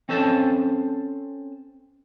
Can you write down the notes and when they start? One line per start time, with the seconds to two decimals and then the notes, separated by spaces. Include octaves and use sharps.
0.09 C4 C#4 A4 C5 A5